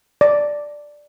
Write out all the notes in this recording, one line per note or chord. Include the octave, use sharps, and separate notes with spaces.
D5